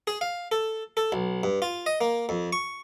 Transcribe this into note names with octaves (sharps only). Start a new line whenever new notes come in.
G#4
F5
A4
A4
B1
G2
F4
D#5
A#3
F2
C#6